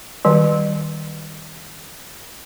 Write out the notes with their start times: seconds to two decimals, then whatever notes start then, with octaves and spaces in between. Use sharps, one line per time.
0.25 D#3 G3